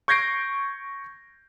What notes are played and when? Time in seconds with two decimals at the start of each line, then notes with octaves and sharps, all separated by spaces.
0.08 C#6 G6 G#6 A#6 C7 D7